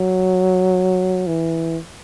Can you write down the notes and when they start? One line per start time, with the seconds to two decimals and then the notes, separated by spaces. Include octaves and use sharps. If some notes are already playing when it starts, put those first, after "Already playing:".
Already playing: F#3
1.27 E3